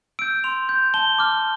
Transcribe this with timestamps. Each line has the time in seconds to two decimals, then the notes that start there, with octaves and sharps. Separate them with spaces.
0.19 E6 D7
0.22 G6
0.44 C6 F7
0.69 G6
0.94 A5 G7
1.18 D6 F6